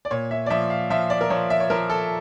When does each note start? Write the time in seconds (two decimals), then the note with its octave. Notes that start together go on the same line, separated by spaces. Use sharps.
0.05 D5
0.11 A#2 C#5
0.31 E5
0.46 D5
0.50 F3 E5
0.70 F5
0.90 F3 E5
1.10 D5
1.21 A#4
1.30 F3 C#5
1.50 E5
1.60 C#5
1.70 F3 A#4
1.90 A4